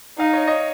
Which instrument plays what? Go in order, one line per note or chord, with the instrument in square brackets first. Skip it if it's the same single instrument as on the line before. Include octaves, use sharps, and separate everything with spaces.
[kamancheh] D#4 [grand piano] D#5 F5
[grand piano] C#5 D#5
C#5 D#5